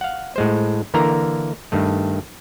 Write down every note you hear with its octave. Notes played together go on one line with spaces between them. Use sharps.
F5 F#5
A2 G#3 C5
D3 E3 A#3 A#4 A#5
G2 D#3 A3